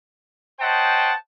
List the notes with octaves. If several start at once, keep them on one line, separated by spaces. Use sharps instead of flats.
C5 C#5 D#5 F#5 G5 A5